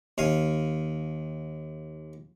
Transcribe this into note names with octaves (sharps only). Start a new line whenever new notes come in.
D#2 F5 G#5